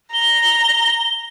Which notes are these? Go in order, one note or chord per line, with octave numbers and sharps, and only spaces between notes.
A#5 G7